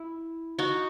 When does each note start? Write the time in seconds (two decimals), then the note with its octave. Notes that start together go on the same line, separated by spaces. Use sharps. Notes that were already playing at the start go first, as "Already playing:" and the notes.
Already playing: E4
0.59 D#4 F#4